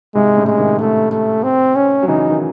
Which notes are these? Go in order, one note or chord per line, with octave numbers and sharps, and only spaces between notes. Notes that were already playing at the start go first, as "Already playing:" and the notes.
G#2 C3 G#3
A2 C#3
G#3
C3 D#3
A3
A3
C4
C#4
F#3
C#3 E3 D#4
D#3